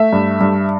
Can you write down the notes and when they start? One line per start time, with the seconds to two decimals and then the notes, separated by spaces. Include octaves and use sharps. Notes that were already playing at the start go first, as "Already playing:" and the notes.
Already playing: A3 E5
0.13 G2
0.41 G2